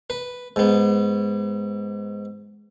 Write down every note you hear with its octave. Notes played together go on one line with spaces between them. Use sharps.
B4
G#2 B3